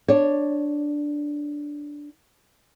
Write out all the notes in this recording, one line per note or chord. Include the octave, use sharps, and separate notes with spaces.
D4 C#5